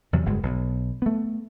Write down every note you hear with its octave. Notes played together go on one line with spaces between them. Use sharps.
E2 C3 F#3
F#1 G2 G#3
B1
A3 B3